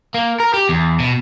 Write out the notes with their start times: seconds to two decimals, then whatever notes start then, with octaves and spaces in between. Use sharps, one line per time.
0.14 A#3
0.40 A#4
0.54 G4
0.69 E2
1.00 B2